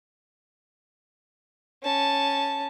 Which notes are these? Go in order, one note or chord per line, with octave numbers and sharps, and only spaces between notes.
C#4 A5